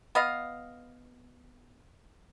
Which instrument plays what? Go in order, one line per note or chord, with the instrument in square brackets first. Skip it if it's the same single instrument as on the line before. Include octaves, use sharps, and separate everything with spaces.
[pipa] B3 D#5 F5